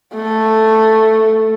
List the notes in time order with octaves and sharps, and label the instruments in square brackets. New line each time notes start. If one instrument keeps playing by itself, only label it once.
[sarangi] A3